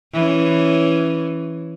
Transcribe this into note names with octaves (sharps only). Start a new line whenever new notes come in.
E3 C#4